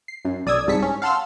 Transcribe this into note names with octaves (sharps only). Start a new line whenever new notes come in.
C7
F#2
B1 D5 D#6 E6 G#6
C2 G#2 A5 B6 C#7
C#4
F5 F#5 A5 C6 E6 F6